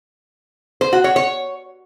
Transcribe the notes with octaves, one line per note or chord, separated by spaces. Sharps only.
C5
F#4
C#5
C#5